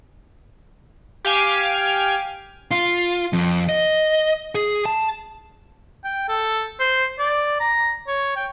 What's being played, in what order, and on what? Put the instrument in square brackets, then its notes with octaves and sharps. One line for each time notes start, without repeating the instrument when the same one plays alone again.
[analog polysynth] G4 F5 G#5 D6 F6
[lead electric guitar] F4
F2
D#5
G#4
A5
[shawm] G5
A4
C5
D5
A#5
C#5
G5